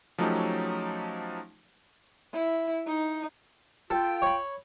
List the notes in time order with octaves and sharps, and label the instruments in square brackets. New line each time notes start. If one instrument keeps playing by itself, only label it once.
[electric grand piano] F3 F#3 A3 C#4 D#4 G4
[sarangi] E4
D#4
[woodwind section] F4 G5 [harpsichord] A4
[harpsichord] C#5 B5